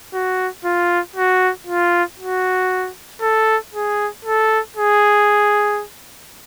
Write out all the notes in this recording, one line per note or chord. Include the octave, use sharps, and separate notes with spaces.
F#4
F4
F#4
F4
F#4
A4
G#4
A4
G#4